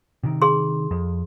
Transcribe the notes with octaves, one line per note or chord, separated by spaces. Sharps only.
C3 D#3
G#4 C6
F2